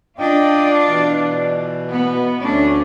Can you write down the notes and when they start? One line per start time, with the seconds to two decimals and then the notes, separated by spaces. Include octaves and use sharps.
0.19 D4 F4 D5 D#5 G5
0.87 B2 E3
1.93 B3
2.43 D2 A3 C#4 D4